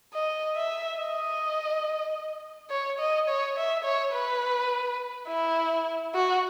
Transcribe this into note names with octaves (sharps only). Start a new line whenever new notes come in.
D#5
E5
D#5
C#5
D#5
C#5
E5
C#5
B4
E4
F#4